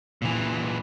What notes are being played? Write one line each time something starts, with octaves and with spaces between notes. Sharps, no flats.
A#2 E3